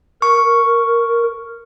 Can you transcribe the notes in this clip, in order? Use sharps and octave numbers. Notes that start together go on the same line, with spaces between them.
A#4 C#6